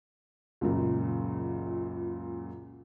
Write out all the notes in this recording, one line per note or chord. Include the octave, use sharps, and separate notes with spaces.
C#2 F#2 A#2